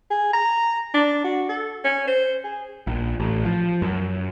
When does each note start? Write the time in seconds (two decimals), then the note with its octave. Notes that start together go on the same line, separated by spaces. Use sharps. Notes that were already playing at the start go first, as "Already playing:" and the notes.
0.10 G#4
0.33 A#5
0.94 D4
1.24 F#4
1.49 A4
1.85 C#4
2.07 C5
2.44 G#4
2.87 A#1
3.20 A1
3.45 F3
3.82 F#2